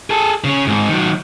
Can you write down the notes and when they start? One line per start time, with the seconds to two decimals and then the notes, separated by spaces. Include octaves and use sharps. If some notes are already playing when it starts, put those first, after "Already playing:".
0.10 G#4 A4
0.44 C#3 C#4
0.67 G#2 C4
0.89 D#3 F#3